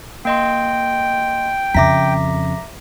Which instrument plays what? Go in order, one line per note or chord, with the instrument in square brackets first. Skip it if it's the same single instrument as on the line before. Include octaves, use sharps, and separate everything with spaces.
[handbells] A#3 D#5 C6 [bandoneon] G5
[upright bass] F2 C#3 [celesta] E5 A#5 [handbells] D6 A#6 B6